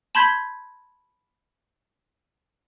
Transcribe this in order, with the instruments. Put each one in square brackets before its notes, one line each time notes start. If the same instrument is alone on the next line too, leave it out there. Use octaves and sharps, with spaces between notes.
[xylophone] A5 B5 C6 G6 G#6 B6